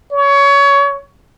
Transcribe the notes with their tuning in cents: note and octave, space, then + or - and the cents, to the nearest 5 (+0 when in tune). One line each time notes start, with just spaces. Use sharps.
C#5 +20